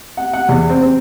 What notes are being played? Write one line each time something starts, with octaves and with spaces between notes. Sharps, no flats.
F#5
F#5
E2
C4
C4